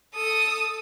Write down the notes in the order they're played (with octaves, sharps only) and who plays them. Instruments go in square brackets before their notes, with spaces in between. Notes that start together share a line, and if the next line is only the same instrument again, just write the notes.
[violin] A4 D#6